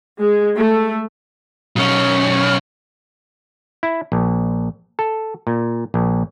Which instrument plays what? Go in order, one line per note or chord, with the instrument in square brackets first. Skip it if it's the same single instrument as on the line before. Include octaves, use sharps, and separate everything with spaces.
[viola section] G#3
A3
[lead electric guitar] B1 C#4
[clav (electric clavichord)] E4
A#1
A4
A#2
A#1